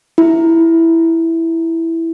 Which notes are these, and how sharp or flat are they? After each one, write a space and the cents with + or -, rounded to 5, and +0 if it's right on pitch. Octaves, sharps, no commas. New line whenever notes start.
E4 +0